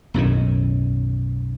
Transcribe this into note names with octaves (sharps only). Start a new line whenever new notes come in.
B1 F#2 A2 D#3